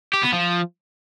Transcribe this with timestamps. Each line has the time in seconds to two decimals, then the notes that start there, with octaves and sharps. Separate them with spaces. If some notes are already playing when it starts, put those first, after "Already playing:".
0.13 G4
0.23 B3
0.33 F3